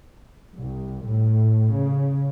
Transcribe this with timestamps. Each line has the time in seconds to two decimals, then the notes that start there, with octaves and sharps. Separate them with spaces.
0.54 C2
1.05 A2
1.71 C#3